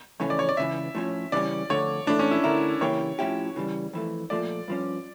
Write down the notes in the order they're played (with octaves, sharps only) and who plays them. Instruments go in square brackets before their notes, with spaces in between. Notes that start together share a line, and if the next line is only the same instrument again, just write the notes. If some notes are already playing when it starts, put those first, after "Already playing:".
[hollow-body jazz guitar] F2 C#3 E3 A3 C#4 [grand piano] C#5
[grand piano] D5
C#5
D5
[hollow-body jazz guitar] C#2 C#3 E3 [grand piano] E5
[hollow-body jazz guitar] A2 F3 C#4
[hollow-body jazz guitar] C#3 E3 G3 C#4 [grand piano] D5
[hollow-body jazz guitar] F2 D3 A3 [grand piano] C#5
[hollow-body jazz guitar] A2 E3 A3 [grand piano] D4
[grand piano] C#4
E4
[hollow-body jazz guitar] D3 A3 E4 [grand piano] A#4
[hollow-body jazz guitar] C#3 E3 A#3 E4 G4 [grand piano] C#5
[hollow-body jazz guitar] A2 F3 C#4 E4 G4
C#3 E3 G3
F2 E3 A3
[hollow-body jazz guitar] A#2 F3 A3 [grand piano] D5
[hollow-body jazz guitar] G2 F3 C#4